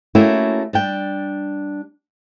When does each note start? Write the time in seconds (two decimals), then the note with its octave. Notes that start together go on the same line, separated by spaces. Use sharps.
0.15 A3 A#3 C#4 E4 F#4 G4
0.73 G3 D4 G5